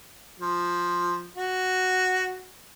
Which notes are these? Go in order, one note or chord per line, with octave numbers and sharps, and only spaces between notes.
F3
F#4